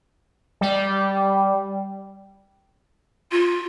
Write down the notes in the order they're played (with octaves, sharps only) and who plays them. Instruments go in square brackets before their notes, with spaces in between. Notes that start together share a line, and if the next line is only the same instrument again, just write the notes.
[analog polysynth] G3
[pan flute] F4